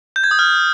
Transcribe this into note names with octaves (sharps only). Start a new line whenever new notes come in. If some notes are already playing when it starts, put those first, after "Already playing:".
G6
G#6
D#6
F6